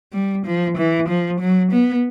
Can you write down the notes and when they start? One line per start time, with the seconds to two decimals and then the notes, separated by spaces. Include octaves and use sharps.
0.13 G3
0.46 F3
0.77 E3
1.08 F3
1.40 F#3
1.72 B3